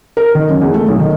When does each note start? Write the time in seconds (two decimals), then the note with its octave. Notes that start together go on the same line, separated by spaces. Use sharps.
0.17 A#4
0.35 D#3
0.49 F#2
0.61 E2
0.74 A3
0.88 B1
1.00 D#3